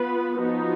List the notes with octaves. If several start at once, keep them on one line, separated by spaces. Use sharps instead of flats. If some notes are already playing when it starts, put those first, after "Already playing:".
Already playing: B3 F4 B4
F3 B3 D#4 F#4